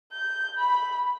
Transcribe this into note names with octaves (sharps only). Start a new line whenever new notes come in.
G6
B5